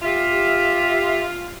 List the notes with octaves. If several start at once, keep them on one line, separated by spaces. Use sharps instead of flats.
F4 G4 E5